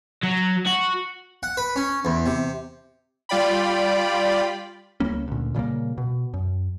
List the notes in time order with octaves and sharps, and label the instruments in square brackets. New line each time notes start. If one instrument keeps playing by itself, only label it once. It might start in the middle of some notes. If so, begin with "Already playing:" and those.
[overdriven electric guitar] F#3
F#4
[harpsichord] F#5
B4
C#4
E2
C3
[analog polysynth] G3 F4 D5 G5 B5
[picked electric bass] C#2 G3 A#3 C#4
D2 A#2
A#2 C#3 G3 A#3
B2
F#2